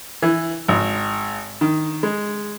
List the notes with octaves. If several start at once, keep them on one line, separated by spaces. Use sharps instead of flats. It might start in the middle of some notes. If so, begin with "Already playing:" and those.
E3
G#1
D#3
G#3